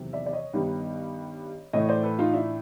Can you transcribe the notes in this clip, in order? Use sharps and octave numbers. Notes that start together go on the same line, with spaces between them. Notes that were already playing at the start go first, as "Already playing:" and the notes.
Already playing: E2 C3 D#3 F#3
D5 E5
D5
C#5 D#5
G2 D#3 G3 B3
A2 E3 A3 C#5 D#5
C5 D5
A4 B4
D#4 F4
D4 E4